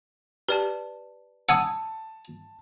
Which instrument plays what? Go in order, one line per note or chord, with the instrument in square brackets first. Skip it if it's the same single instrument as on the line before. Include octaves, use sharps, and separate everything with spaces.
[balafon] G4 [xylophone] B4 D5 A5
[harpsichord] F#5 G#5 D#6 [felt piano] A5 [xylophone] E6